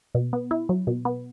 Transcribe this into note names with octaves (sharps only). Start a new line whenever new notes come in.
B2
B3
E4
F#3
B2
B3